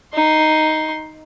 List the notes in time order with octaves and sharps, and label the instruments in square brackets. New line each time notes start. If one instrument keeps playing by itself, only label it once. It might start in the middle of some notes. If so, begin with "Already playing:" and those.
[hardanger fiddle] D#4 C6